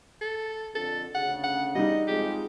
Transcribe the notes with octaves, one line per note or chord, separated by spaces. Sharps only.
A4
F2 D3 A4
D2 C#3 F#5
F#5
G3 D#4 D#5
F2 G#3 G4